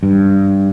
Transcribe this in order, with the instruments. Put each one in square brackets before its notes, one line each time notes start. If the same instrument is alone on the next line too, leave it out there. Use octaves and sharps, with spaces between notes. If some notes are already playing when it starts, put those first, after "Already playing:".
[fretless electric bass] G2